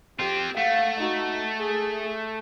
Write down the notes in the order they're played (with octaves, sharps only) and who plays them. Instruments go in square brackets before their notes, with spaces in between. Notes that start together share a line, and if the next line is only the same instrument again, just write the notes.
[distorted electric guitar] C4 F4 [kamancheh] G4
[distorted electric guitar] A3 [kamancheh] F5 F#5
[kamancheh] D#4 F#4
G#4